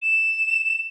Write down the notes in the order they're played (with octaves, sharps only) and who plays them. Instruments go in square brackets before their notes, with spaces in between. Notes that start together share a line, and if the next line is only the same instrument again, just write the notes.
[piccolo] E7